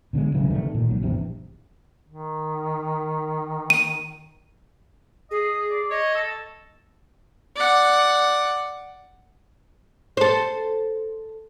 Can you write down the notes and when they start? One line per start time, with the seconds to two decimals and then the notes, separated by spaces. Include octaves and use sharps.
0.13 B2 D3 D#3 G#3
0.34 A1 C#3 E3 F#3
0.50 C3 D#3 G3 A3
0.75 A#2 D#3
0.89 C2 F#3
1.02 A#1 E2 G2 C3
2.09 D#3
3.70 D#7
5.31 G#4 D#5
5.70 D5
5.91 C#5 D#5
6.15 A4
7.56 D5 F#5
10.17 A4 C5